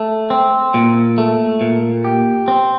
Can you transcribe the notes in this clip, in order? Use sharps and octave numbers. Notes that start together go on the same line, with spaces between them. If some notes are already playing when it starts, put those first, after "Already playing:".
Already playing: A3
C4
A#2
A3
A#2
G4
C4